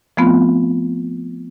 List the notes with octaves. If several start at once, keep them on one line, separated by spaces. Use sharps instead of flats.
F3 A3 B3 C4 F4